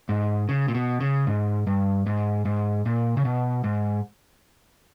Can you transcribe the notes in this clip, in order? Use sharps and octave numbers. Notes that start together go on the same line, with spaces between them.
G#2
C#3
A#2
B2
C#3
G#2
G2
G#2
G#2
A#2
C#3
B2
G#2